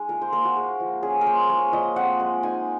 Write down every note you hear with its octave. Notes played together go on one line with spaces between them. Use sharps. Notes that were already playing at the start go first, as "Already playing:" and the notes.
Already playing: G#3 D#4 G#4
F4 A#4
C5
A#3 A#4
F#4
G#3
F3
C#4 G#4
A#4
A#3 C5
G#3 C#5
F3 D#5
C4 F#5
G#3
D#4 G#5